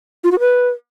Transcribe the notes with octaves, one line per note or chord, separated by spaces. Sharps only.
F4
F#4
B4